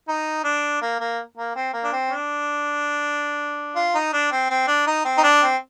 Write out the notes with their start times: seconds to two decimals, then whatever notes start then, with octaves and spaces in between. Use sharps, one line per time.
0.08 D#4
0.44 D4
0.82 A#3
1.00 A#3
1.37 A#3
1.55 C4
1.73 A#3
1.84 D4
1.92 C4
2.11 D4
3.76 F4
3.95 D#4
4.13 D4
4.31 C4
4.50 C4
4.68 D4
4.87 D#4
5.05 C4
5.18 D#4
5.24 D4
5.42 C4